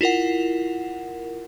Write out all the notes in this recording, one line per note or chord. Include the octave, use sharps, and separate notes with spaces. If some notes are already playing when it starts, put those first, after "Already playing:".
E4 F4 A#4 F#5